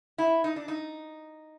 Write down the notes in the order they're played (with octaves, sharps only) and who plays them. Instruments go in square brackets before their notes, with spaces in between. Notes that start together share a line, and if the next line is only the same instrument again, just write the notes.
[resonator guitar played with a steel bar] E4
D#4
D4
D#4